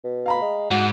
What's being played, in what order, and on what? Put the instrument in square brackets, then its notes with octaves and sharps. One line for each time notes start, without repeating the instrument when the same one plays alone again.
[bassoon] B2
[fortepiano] F5 A#5 B5
[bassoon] G#3
[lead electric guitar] G#2 [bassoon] F#4